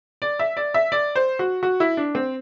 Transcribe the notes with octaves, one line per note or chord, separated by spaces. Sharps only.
D5
E5
D5
E5
D5
C5
F#4
F#4
E4
D4
C4